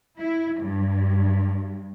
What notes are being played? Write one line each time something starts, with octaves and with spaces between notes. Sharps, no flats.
E4
G2